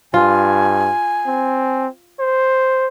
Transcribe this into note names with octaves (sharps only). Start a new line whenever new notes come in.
G2 F4 G#5
C4
C5